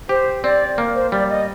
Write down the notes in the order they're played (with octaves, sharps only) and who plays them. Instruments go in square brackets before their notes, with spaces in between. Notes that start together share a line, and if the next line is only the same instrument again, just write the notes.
[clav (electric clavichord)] G4 [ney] C5
[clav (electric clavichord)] C4 [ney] D5
[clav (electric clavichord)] A#3
[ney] C5
[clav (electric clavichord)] G3 [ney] D5
[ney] D#5